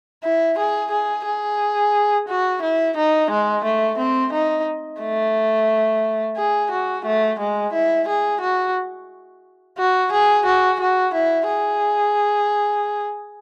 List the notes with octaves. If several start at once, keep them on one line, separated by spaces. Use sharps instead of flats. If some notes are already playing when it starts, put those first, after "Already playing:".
E4
G#4
G#4
G#4
F#4
E4
D#4
G#3
A3
C4
D#4
A3
G#4
F#4
A3
G#3
E4
G#4
F#4
F#4
G#4
F#4
F#4
E4
G#4